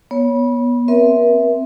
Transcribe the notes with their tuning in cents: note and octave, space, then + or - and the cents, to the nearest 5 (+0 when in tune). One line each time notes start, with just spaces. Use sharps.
B3 -25 C#5 +10
C4 +0 A#4 +40 E5 +0